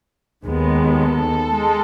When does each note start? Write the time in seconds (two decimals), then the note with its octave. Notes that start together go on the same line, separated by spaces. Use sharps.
0.44 D#2 D#3 G#3 B3
0.97 A4
1.52 G#3